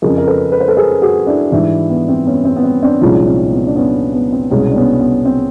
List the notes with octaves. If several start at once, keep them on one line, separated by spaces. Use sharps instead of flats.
F2 C#3 F3 G#4 A#4
A#4
A4 B4
B4
C5
A4 B4
G#4 A#4
F#4 G#4
D4 E4
G#2 E3 G3 D4 E4
B3
C4
B3 C#4
C4
B3
C4
C4 D4
C2 A#2 F3 G#3 C#4 D#4
C4
B3
D4
B3 C#4
B3
C4
C2 B2 G#3 B3 C#4
D4
B3 C#4
B3
C4